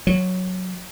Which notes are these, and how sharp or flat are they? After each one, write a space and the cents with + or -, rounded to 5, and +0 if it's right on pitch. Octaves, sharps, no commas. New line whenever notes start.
F#3 -10